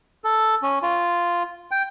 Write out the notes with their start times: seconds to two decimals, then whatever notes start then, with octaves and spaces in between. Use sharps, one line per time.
0.24 A4
0.63 C#4
0.83 F4
1.71 G5